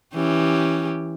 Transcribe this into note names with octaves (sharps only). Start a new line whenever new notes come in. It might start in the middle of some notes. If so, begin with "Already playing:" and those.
E3 C#4 G4